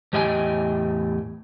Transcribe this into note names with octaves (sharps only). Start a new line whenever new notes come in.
E2 A2 G4 D#5 G5 G#5